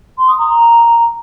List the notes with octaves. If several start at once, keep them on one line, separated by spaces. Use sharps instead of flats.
C6
D#6
A#5